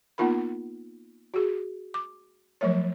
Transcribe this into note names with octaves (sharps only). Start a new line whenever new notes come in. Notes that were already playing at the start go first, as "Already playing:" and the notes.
A#3 B3 D#4 F4 A#4 B5
F#4 G#4
D6
F3 F#3 A3 A#4 C#5